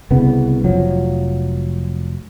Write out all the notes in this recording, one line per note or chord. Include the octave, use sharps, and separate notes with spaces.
C2 C#3 B3
F1 F3 F#3